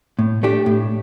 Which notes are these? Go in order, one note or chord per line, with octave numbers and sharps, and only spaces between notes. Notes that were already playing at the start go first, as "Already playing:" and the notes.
A2
A3 D4 G4
A2